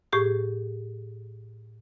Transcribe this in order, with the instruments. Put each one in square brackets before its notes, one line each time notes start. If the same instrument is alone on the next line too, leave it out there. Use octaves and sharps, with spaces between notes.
[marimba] A2 G4 G#4